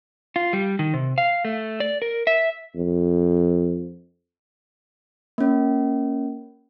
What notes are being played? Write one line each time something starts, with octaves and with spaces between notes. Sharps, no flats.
F4
G3
D#3
C3
F5
A3
D5
A#4
E5
F2
A#3 C#4